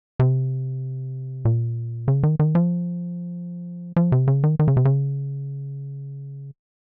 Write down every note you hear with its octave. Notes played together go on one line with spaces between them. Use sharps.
C3
A#2
C#3
D#3
D#3
F3
F3
C3
C#3
D#3
D#3
C#3
C3
C#3